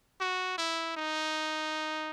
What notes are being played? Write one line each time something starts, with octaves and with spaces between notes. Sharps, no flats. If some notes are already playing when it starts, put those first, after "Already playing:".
F#4
E4
D#4